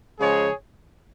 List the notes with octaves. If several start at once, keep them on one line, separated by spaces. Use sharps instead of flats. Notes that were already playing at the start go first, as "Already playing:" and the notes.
C#3 F3 G#3 G#4 C#5